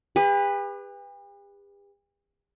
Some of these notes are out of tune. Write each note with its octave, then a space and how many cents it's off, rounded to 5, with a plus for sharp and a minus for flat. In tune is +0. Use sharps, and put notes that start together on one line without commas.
G4 +45 B4 +0